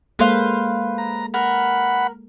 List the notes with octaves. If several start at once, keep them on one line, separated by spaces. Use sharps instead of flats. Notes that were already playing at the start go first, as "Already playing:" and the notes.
G#3 A#3 A4 B4 C5 F5
A#5
A#4 F#5 B5